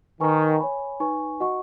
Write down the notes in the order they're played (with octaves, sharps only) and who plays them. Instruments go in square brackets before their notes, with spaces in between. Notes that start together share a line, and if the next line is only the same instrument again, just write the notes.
[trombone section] D#3 [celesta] B4 G#5 C#6
[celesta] C#5 G#5 B5
D#4 B4 G#5 C#6
F#4 D#5 F#5 C#6